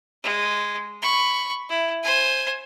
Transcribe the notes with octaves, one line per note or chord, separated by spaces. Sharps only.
G#3
B5 C#6
E4
C5 G#5